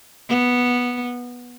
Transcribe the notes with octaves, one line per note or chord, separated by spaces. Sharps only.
B3